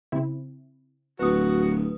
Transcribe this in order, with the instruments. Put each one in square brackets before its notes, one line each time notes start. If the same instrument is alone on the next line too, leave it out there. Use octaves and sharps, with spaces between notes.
[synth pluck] C#3 C4 E4
[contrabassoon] D1 [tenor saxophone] F#4 [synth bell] B4 D#6